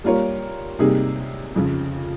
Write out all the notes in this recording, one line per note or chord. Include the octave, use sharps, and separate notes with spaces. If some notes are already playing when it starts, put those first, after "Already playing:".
G3 A#3 F4 A#4 C#5
C3 G3 A#3 D#4 G#4
F2 C#3 F3